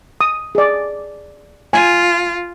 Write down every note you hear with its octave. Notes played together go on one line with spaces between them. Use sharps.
D#6
G#4 D5
F4 G#5